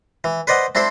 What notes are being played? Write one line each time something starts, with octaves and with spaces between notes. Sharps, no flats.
E3
B4 C5 D5 D#5 F#5
C4 D4 E4 A4 C5